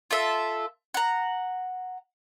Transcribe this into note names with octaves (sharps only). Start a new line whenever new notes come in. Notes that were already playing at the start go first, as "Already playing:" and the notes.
F4 A4 E5
F#5 A#5